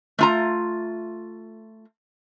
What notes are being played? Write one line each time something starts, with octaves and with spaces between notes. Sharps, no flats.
A3 F4 A#5